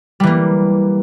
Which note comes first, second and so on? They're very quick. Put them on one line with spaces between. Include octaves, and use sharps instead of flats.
G3 E3 A#3